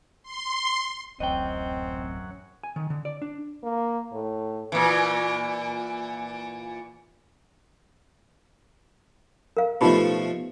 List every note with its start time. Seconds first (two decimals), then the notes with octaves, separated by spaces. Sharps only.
0.23 C6
1.20 D1 A1 F#2 F#3 C4 D#5 F#5 G5
2.64 G#5
2.76 D#3
2.90 D3
3.05 D5
3.22 D4
3.63 A#3
4.12 A2
4.72 A#2 E3
9.57 A#4 F5
9.81 B2 F3 A3 D#4 F4 G4